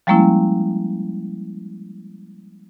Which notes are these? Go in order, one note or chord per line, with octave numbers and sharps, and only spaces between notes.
F3 G3 G#3 A#3 C#4 E4